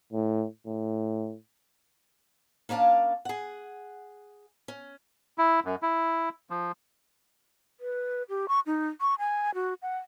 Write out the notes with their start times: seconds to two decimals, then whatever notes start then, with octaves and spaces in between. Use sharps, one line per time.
0.13 A2
0.67 A2
2.69 A#3 C#4 D4 F5 A5
3.25 G#4 F#5
4.68 C#4
5.38 E4
5.65 F#2
5.82 E4
6.50 F3
7.80 B4
8.29 G4
8.48 C#6
8.67 D#4
9.01 C#6
9.19 G#5
9.55 F#4
9.82 F#5